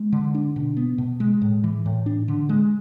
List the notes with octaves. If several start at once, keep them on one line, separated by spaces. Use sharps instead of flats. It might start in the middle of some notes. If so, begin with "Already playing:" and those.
Already playing: G#3
D3
D4
B2
B3
B2
G#3
A2
E3
A2
D4
D3
G#3